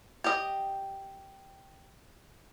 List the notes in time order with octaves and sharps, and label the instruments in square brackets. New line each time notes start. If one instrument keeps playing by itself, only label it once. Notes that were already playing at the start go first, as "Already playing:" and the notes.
[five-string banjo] G4 D#5